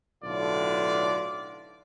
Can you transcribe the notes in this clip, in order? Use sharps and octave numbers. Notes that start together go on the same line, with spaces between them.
B1 A2 D3 F4 D5